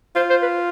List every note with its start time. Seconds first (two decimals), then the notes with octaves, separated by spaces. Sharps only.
0.16 F4 C5
0.30 C5
0.43 B4